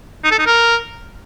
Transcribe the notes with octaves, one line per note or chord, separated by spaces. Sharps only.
D#4
A4
D#4
A#4